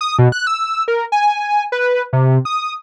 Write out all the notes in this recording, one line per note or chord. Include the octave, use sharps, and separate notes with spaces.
D#6
B2
F#6
E6
A#4
G#5
B4
C3
D#6